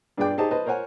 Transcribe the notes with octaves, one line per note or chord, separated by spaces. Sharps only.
G2 D4 G#4 D5 G5 D6
D#4 G4 G#4 C5 D#5 A5
B4 C5 D#5 A5
A#4 C5 C#5 F#5 G#5